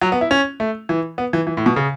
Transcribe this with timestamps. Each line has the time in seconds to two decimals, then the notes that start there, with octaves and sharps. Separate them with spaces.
0.02 F#3
0.12 B3
0.21 E4
0.31 C#4
0.60 A3
0.89 E3
1.18 B3
1.33 E3
1.47 E3
1.57 A2
1.66 B2
1.76 C#3